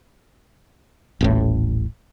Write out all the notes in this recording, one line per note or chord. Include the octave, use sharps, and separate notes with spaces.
D#1 A1 A2